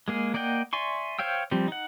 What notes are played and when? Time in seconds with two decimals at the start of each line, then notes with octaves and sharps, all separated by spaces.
0.08 G#3 A#3 G#4
0.34 A#3 D5 D#5 F#5 G5
0.73 D5 E5 G#5 C6 C#6
1.19 C5 C#5 F5 G5 E6
1.51 F3 G3 C4
1.68 D#4 F#5